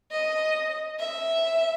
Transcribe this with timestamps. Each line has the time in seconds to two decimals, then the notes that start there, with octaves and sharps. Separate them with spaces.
0.11 D#5
0.99 E5